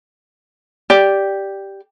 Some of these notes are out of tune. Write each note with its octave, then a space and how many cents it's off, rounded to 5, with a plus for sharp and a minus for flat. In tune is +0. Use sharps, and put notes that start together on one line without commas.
G4 +0 D5 +0